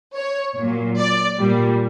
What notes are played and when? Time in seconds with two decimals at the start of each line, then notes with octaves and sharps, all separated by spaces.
0.16 C#5
0.57 A#2 F#3
0.98 D5
1.39 A#2 G3